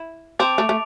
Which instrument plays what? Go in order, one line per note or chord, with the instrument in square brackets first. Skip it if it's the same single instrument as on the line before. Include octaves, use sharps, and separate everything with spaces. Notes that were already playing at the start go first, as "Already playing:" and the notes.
Already playing: [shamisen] E4
[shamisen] C4 [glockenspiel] A5 D6 A6 D7 F7
[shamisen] A3
A3